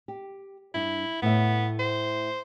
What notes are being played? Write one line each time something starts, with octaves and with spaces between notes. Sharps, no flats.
G4
G2 D4 E4
A2 B3 E5
C5